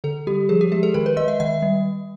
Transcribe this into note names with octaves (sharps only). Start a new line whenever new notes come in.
D3 A4
G3 G4
F3 G#4
G4
G#3 G#4
A4
D#3 A#4
B4
G#3 D#5
E5
D#3 E5
G3